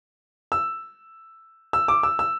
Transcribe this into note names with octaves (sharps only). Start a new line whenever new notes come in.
E6
E6
D6
E6
E6